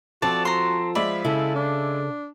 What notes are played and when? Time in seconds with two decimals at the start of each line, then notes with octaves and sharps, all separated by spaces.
0.22 F3 C4 F#4 A4 D5 A5
0.45 A#5 C6
0.95 F3 G#3 D5 E5 B5
1.25 C#3 E4 A4
1.55 D4